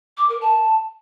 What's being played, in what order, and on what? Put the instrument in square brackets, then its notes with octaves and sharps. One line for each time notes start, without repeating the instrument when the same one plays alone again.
[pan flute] D6
A#4
A5